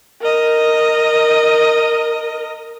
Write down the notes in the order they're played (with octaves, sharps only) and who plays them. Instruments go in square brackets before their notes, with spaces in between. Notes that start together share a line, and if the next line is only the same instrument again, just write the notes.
[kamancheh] A#4 D#5